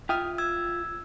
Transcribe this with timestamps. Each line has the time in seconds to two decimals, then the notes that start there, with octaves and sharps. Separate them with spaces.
0.09 F4 E5 G5 D#6 F6
0.38 E6 G#6